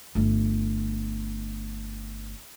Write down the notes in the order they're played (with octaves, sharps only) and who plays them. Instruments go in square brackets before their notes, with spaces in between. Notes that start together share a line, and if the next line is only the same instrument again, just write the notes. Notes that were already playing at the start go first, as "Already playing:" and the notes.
[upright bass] G1 A3